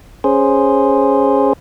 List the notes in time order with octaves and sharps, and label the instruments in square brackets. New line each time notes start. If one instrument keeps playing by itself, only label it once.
[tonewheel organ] C#4 G#4 C5